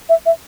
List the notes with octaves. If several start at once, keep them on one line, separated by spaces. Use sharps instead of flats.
E5
E5